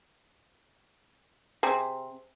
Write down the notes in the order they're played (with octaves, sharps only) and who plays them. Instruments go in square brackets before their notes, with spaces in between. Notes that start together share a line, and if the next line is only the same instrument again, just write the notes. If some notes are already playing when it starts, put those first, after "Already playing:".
[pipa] C3 [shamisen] G#4 C5